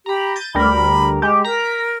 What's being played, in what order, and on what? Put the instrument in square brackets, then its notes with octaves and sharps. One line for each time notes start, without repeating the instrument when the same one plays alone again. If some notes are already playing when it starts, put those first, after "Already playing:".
[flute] G4 [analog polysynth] A#5 B5
[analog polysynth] G6 A6 D#7
[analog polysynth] D2 G3 A#4 [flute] B5
[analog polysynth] G#3 G4
[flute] A#4 [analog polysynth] A#5 B6